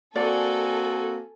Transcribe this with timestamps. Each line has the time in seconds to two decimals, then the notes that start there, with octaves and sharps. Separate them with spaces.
0.16 A#3 C4 F#4 A4 D5 G#5